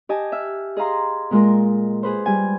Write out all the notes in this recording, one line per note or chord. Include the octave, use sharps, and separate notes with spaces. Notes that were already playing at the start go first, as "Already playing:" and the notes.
G4 D#5 G#5 A5
E5 F6
G#4 D#5 F5 A#5 C6
A#2 G#3 F4 A#4
G#4 B4 C5
G3 G#5